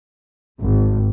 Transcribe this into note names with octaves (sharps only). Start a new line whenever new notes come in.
G#1